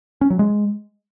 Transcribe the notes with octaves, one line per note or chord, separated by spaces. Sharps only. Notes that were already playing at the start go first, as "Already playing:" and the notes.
C#4
F#3
G#3